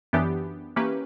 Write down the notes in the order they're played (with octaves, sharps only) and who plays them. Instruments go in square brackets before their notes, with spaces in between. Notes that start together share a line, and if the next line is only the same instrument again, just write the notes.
[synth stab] F#2 E3 B3 D4 G4
E3 A#3 C#4 G4 B4